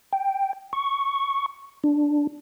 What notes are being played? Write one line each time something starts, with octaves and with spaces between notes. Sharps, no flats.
G5
C#6
D4